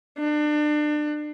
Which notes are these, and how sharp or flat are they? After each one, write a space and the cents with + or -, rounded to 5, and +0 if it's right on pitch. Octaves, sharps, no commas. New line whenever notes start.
D4 +30